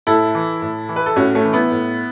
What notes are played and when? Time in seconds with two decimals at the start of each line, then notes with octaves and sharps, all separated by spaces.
0.07 A2 E4 A4
0.35 E3
0.62 A2
0.89 E3
0.96 B4
1.06 A4
1.16 A2 C#4 F#4
1.35 A3 C#4
1.44 E3
1.53 B3 E4
1.72 A2